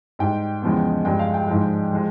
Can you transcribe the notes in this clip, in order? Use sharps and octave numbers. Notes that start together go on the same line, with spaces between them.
G#2 G3 G5
E2 C#3 F3 G#3
G2 F3 G#3 G5
F5
G5
G#2 F3 G#3
F3 G#3